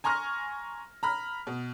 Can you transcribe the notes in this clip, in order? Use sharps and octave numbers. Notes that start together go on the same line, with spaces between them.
G#5 A#5 C6 C#6 F6 A#6
A#5 B5 F6
B2